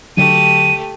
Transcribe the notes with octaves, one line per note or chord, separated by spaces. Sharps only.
D3 F#3 A3 D4 G4 D#7